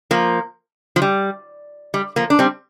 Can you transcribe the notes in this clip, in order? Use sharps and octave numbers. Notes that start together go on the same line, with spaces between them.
F3 A#3
F3
G3
G3
F3 A#3
D4
G3 C4